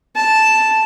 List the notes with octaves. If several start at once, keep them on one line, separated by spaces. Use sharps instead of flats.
A5